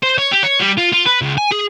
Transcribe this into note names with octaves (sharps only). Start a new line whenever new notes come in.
C5
C#5
G4
C#5
G3
F4
F4
B4
C#2
G#5
G#4